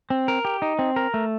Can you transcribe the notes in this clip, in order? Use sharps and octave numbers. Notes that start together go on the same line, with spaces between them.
C4
A#4
G4
D#4
C4
A#4
A3